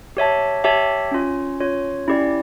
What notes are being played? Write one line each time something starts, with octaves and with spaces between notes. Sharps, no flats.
G4 C#5 E5 A5
G4 C#5 E5 A5
C#4 F4 C#5
C#4 F4 C#5
C#4 E4 G4 D5